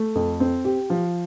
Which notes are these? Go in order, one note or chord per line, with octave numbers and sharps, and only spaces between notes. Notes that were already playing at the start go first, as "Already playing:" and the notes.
Already playing: A3
F2
C4
G4
F3